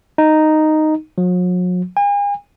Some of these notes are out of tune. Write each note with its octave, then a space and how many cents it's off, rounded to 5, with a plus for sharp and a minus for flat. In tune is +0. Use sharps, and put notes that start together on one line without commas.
D#4 -5
F#3 -45
G#5 -40